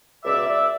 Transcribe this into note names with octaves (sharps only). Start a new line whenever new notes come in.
C#2 B2 D5 E5
D5 E5